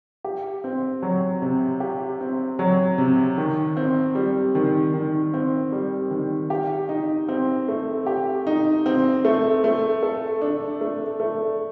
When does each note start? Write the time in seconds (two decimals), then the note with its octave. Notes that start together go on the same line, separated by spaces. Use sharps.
0.24 G4
0.64 C4
1.02 F#3
1.42 C3
1.80 G4
2.21 C4
2.59 F#3
2.98 C3
3.38 D#3
3.77 C4
4.15 G3
4.55 D#3
4.94 D#3
5.34 C4
5.72 G3
6.11 D#3
6.50 G4
6.89 D#4
7.29 C4
7.68 A3
8.06 G4
8.47 D#4
8.86 C4
9.25 A3
9.64 A3
10.03 A4
10.42 D4
10.81 A3
11.20 A3